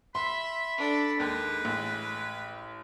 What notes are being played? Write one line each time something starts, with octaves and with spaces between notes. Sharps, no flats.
E5 B5 C6
D4 A4
D#2 G#3 B4
A1